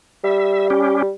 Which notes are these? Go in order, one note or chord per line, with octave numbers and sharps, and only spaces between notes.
G3 E5
C#4 G4